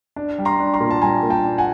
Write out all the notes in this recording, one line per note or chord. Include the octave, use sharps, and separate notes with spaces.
D4
G3
A#5 C6
D4
A#5 C6
A#2
A5
G3 G#5 A#5
A#2
G5 A5
D4
F#5 G#5